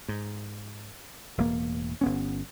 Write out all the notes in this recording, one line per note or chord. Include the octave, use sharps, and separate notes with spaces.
G#2
E1 E2 A2 A#3
G1 B3 C#4